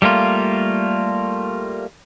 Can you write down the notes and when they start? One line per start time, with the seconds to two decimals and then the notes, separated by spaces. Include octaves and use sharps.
0.02 G3 A3 A#3 F4